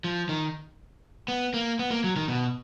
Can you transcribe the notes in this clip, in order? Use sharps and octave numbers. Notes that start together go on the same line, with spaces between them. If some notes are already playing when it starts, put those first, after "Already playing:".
F3
D#3
B3
A#3
B3
A#3
F#3
D#3
B2